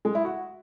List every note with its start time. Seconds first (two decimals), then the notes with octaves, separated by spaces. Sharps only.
0.05 G#3
0.15 E4
0.25 F#4